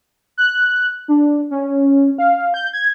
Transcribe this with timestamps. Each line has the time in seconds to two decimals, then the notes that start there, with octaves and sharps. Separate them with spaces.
0.38 F#6
1.08 D4
1.51 C#4
2.18 F5
2.54 G6
2.73 G#6